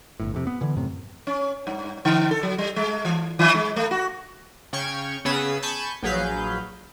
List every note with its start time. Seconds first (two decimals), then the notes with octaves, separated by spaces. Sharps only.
0.20 G1 A2
0.34 F2 C3
0.47 B3
0.61 D3 E3
0.76 F#2 A2 C3
1.27 C#4
1.67 G2
2.05 D3
2.31 A4
2.43 F#3
2.58 G3
2.76 G#3
3.05 E3
3.39 D#3
3.55 G#3
3.76 A3
3.91 F#4
4.73 C#3 G5 C#6 F6 G#6
5.25 C#3 B3 G#4 B4 D#6 E6
5.62 G#5 A5 B5 C#6 G6 A6
6.03 A#1 F#3 G#4 B4 F5 G6